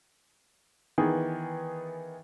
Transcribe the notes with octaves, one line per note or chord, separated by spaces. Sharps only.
D#3 E3 B3 G#4